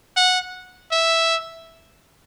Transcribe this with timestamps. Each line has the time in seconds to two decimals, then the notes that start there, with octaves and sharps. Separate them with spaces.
0.16 F#5
0.92 E5